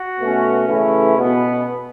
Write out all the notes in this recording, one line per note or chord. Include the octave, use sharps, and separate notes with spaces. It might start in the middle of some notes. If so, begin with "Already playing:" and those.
Already playing: F#4
B2 A3 C#4
C#3 E3 A3 C#4 E4
B2 B3